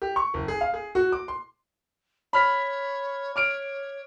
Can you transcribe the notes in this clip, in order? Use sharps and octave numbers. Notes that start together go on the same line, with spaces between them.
G4
C#6
F#1
G#4
F5
G#4
F#4
D6
C6
C#5 B5 F6 B6
C#5 D6 F6 D7